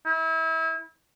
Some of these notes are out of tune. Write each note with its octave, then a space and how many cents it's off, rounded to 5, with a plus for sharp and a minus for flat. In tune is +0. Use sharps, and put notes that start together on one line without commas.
E4 -30